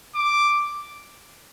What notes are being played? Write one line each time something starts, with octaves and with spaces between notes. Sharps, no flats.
D6